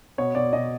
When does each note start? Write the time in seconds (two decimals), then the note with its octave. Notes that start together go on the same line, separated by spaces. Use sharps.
0.18 B2 C#5
0.35 B2 D5
0.53 B2 D#5